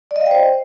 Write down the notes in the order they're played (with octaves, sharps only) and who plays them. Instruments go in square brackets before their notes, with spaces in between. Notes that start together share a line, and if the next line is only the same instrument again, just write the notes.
[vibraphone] D5
D#5
F5
G5
C5